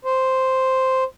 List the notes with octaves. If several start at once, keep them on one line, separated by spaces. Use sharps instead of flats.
C5